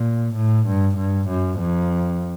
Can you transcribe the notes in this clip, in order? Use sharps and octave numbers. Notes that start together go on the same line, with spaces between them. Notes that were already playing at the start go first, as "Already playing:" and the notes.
Already playing: A#2
A2
G2
G2
F#2
F2